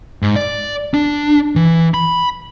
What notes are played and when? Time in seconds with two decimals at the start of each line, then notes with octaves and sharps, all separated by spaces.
0.22 G#2
0.36 D5
0.94 D4
1.56 E3
1.94 B5